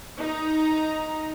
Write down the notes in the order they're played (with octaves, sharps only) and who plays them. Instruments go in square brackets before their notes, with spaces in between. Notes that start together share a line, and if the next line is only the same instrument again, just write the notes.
[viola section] D#4 A#5